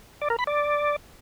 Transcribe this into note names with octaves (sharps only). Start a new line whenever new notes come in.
D5
A#4
B5
D5